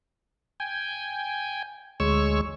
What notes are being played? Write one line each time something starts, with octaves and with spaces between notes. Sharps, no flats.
G5 G#5
D2 G#3 C#5 C#6 E6